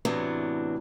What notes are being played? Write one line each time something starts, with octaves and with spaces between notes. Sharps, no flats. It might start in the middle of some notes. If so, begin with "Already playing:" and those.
A2 C3 E3 F#3 B3 D4